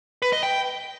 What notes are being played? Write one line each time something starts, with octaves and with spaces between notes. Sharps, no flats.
B4
D#5
G5